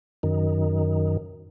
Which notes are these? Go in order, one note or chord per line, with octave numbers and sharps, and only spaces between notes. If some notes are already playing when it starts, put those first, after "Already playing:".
F#2 D#3